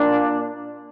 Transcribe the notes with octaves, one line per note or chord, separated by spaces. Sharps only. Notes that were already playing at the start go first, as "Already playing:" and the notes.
Already playing: A#2 A#3 D4